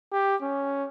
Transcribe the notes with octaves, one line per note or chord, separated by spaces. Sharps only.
G4
C#4